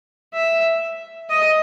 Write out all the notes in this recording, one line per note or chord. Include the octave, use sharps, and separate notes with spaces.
E5
D#5